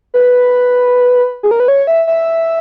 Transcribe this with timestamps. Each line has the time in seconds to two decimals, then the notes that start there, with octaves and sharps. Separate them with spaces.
0.14 B4
1.43 G#4
1.51 A#4
1.60 B4
1.68 C#5
1.87 E5
2.07 E5